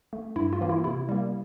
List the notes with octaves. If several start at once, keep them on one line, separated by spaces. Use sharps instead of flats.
A3
G2 E4
F4
E3 A#3
E4
C3 E4
G3 A#3